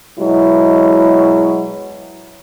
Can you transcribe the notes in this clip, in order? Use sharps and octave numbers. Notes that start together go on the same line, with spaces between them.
B2 F#3 G#3 E4